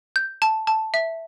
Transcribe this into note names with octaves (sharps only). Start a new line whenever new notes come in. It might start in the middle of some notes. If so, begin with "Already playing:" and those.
G6
A5
A5
E5